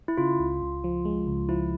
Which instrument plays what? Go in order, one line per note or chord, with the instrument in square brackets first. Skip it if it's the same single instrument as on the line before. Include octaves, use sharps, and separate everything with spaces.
[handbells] E4
[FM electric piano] C#3 [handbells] F4
[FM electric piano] C#2
C#2
F3
G#3
C#2
[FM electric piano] F3 [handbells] E4